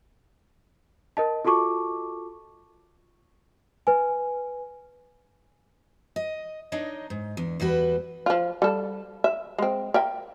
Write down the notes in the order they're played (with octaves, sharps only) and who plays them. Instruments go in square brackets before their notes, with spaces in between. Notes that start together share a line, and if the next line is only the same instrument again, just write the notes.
[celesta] A#4 D#5 A5
F4 F#4 A4 A5 C#6 D6
B4 G#5
[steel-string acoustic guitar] D#5
D4 D#4 C#5 D#5
G#2
E2 D4
E2 G3 F#4 B4
[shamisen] F3 F4
G3 A4
E5
G#3 C4
A#4 E5 G5